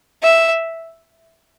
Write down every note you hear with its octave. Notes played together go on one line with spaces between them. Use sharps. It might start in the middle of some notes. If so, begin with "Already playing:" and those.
E5